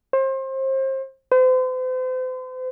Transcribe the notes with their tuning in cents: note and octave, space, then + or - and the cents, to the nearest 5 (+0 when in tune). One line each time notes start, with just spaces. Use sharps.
C5 +30
C5 -40